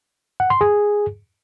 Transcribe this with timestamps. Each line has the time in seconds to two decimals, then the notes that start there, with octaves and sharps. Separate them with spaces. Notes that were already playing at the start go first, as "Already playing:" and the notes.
0.40 F#5
0.50 C6
0.61 G#4